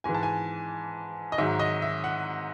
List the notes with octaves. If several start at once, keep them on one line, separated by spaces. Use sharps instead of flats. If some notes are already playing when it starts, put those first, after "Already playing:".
G#2 E3 G#5
A5
G#5
D#5
G#2 D#3 F#3 E5
D#5
E5
F#5